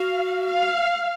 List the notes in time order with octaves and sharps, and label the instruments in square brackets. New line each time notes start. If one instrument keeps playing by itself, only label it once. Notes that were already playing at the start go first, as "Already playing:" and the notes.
Already playing: [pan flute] F#4 [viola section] F5
[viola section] F5